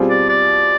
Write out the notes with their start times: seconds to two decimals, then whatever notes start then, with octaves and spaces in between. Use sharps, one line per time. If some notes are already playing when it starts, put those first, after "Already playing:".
Already playing: B2 G3 C4 F4 G#4
0.10 D5
0.29 D5